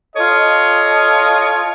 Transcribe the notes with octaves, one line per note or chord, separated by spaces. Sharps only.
F4 A4 C#5 D#5